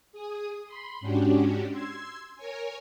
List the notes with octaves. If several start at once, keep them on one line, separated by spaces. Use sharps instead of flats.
G#4 D#6
B5 C6
G#2 C#4 D4 F#4 G4
C6 E6 G#6
A#4 C#5 G#5